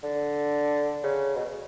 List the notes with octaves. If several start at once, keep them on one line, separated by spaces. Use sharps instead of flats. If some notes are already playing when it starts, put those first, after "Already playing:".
D3
C#3
B2